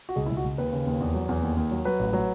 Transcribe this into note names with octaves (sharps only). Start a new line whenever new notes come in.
F#4
C#2 G#4
E4
C#2
F#4
C#2
D#2 B4
C#3
D#2
E2
F#3
E2
D#2
D#2
F#3
F#3 B4
A1
F#3